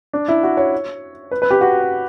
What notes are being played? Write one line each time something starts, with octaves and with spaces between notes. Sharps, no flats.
D4
E4
F#4
C#5
B4
B4
G4
F#4